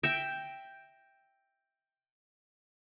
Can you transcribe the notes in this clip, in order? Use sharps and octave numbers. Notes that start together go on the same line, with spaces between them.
E5 G5 G6 A#6 D7